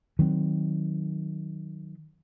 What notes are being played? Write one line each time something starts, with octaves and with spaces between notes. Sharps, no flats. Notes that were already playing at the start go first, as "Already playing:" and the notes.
D#3 F#3 C4